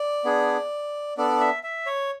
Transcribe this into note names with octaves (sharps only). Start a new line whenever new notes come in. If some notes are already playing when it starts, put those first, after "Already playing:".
Already playing: D5
B3 D4 G#4
B3 D4 A4 D5
E5
E5
C#5